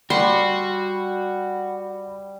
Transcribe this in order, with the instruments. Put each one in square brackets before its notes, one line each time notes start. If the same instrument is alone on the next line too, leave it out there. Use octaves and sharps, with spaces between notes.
[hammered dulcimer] G3 [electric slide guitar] F#4 [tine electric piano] B5 [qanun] C6